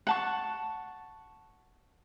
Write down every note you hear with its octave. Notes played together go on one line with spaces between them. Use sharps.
F#5 A5 C#6